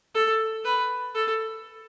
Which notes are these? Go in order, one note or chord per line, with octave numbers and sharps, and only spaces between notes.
A4
B4
A4